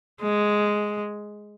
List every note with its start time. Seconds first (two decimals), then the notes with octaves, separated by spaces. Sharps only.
0.21 G#3